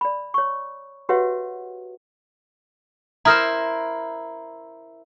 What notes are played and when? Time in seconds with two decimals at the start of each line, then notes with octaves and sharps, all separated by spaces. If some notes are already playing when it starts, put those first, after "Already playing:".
0.01 D5 B5
0.34 C#5 C#6
1.09 F#4 G4 B4 C#5 E5 F#5
3.25 E4 A#4 C5 A#5 D#6 F6